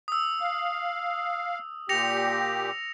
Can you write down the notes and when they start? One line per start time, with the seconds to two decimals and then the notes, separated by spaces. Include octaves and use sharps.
0.08 D#6 E6
0.40 F5
1.89 A#2 G4 A#6 C#7 F7